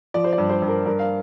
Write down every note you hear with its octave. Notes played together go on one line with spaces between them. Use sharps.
F3 D5
C5
D5
G2
C5
G2
A#4
G2 A#4
F5